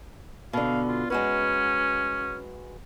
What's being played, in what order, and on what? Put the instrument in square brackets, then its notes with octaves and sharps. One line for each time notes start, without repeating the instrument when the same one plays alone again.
[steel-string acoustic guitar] B2 D3 [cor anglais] F5
[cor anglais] F4
[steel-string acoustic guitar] G#3 F#4 B4 [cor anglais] C#4